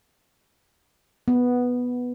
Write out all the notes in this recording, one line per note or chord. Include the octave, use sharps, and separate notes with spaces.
B3